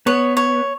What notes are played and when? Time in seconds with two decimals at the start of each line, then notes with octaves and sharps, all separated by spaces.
0.06 B3 C#5
0.37 C#5